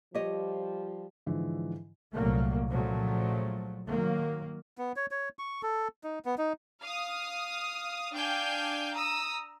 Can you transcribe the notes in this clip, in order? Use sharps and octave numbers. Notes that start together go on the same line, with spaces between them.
F3 G3 G4 C#5 D#5
G#2 D3 E3 F3
C2 A#2 F#3 A3 A#3
A#2 C#3 F3 F#3 A3
D#3 F#3 A#3
B3
C#5
C#5
C#6
A4
D#4
B3
D#4
F5 D#6
D4 F5 G5 G#5 G6
A#5 D#6 E6